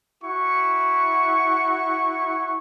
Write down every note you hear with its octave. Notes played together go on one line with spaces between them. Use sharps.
E4 F#4 C#6